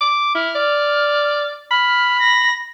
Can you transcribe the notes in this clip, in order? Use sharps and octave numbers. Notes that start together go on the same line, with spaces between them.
D6
E4 F6
D5
B5 F6
A#6